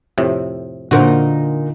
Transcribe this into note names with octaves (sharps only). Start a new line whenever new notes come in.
F2 A2 C3
A#2 D3 D#4 F#4 A#4 C5 F#5